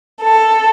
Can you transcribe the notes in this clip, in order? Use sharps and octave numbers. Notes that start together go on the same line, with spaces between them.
A4